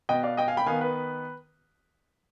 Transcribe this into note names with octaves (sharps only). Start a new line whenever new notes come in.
B2 B3 D#5 G5
D5 F5
D#5 G5
F5 G#5
G5 B5
D#3 B3 F5 G#5
B4